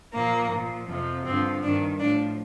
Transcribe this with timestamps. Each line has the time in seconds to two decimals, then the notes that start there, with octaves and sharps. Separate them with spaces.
0.13 A#2 F3 A#3
0.50 A#2 F3
0.88 F2 C3 F3
1.25 G2 D3 F3 C4
1.63 G2 D#3 D4
1.99 A2 F3 D4